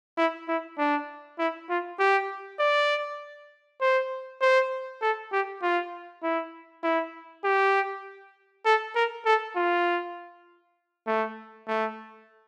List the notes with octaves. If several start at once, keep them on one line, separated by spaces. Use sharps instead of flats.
E4
E4
D4
E4
F4
G4
D5
C5
C5
A4
G4
F4
E4
E4
G4
A4
A#4
A4
F4
A3
A3